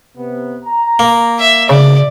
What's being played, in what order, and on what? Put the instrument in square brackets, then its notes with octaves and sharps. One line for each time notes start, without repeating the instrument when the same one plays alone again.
[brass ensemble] C3 B3
A#5
[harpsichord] A#3
[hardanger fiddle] E5
[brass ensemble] D2 G#2 D#4 [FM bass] C#3 [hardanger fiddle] D5